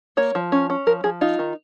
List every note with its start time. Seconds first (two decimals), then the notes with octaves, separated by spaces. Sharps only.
0.17 A#3 C#5
0.35 F3
0.52 C#4
0.70 C#4
0.87 F3 A#4
1.04 F3 G#4
1.21 D#4 F4
1.39 D#3